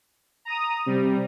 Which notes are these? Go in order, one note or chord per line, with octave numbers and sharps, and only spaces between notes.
A#5 D#6
C3 G3